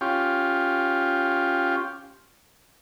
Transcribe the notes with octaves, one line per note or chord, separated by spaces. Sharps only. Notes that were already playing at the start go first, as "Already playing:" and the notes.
C#4 F4 G4